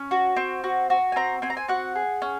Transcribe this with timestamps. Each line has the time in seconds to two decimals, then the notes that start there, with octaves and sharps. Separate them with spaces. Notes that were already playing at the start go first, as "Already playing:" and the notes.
Already playing: C#4
0.11 F#4
0.37 C4
0.64 F#4
0.90 F#4
1.12 G#5
1.16 C4 A#5
1.42 C4 G#5
1.50 A#5
1.57 G#5
1.68 F#4 F#5
1.96 G#4
2.22 C#4